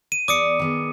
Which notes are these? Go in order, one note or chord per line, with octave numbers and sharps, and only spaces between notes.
D#7
E2 D5 D6 D#6 C#7
D#3 B3 G#4